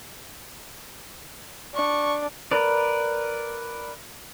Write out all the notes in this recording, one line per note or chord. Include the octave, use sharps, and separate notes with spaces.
D4 C#6
A#4 B4 D5